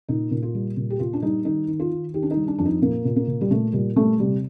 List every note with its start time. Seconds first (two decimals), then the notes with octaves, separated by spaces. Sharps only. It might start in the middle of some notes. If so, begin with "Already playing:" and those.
0.08 A#2 D#4
0.31 A#2
0.43 F4
0.55 G3
0.77 A#2
0.90 G4
1.00 A#2 F4
1.13 D4
1.22 G3 D#4
1.45 D#3 D#4
1.68 D#3
1.80 F4
1.91 D#3
2.14 D#3 G4
2.23 D4
2.31 D#4
2.37 G3
2.48 D4
2.58 F2 D4
2.65 D#4
2.82 A#2 A#3
3.05 A#2
3.16 A#3
3.28 A#2
3.41 G3
3.51 A#2 A3
3.73 A#2 G3
3.96 G3 A3
4.19 C3 G3